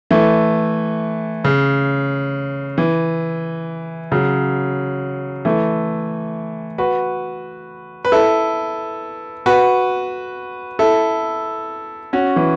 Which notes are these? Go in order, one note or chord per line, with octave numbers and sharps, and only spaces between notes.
E3 A3
C#3
E3
C#3 F#3
E3 A3
F#4 B4
B4
E4 A4
F#4 B4
E4 A4
C#4 F#4
E3